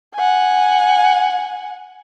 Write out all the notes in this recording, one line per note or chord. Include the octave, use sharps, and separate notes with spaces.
F#5 G#5